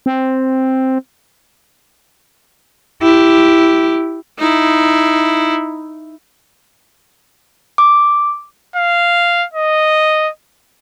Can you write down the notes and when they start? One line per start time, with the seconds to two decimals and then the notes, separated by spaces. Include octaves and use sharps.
0.06 C4
3.02 E4 G4
4.39 D#4 E4
7.78 D6
8.76 F5
9.54 D#5